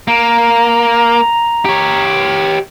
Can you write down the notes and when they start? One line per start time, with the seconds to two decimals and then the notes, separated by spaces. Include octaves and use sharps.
0.08 A#3 A#5
1.65 G4 C#5